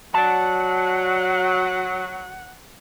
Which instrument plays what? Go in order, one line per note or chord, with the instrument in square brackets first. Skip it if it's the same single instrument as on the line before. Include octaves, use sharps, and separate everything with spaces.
[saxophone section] F#3 [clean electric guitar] D5 A5 [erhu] F#5